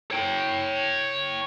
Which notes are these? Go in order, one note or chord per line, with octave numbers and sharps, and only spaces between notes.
C#5 G5